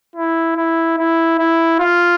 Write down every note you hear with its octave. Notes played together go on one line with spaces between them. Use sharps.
E4
E4
E4
E4
F4